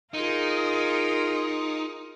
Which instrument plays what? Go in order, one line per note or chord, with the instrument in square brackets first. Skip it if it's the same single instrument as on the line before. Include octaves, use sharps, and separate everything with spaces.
[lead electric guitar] D#4 [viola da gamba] F4 G#4 A#4